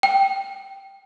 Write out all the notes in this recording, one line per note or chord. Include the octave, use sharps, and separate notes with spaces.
G5